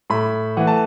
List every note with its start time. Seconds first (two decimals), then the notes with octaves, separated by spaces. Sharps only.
0.10 A2 B5
0.57 E3 A3 F#5
0.67 A5